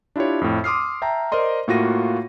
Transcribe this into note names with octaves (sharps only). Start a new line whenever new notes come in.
D4 E4 F4 G4 C#5
F2 A2
C6 D6 D#6 F6 C7
E5 G5 A5 A#5
A#4 C5 D5 D#5 C6
A2 A#3 F4 F#4 A#6 D#7